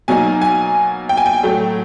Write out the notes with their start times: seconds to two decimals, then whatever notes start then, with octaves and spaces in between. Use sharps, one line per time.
0.08 B2 F#3 A#3 D#4 G#5
0.42 G#5
1.09 G5
1.17 G#5
1.26 G5
1.43 A2 F#3 A3